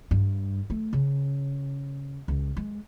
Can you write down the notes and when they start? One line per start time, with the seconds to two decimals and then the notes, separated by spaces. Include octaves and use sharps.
0.11 G2
0.70 A3
0.93 C#3
2.28 C#2
2.56 G#3